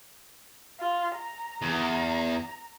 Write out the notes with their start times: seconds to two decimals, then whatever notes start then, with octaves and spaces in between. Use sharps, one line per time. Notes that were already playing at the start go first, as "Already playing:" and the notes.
0.80 F4
1.16 A#5
1.62 E2